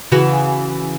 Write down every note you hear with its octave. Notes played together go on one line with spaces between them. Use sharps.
C#3 E3 F#4